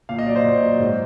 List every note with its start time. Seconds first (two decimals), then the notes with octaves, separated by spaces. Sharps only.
0.09 A#2 F5
0.18 D#5
0.26 F#3 D5
0.36 C5
0.44 A#2
0.61 F#3
0.79 G#2